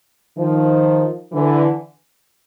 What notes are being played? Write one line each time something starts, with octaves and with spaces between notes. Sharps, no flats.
D#3 F3
D3 E3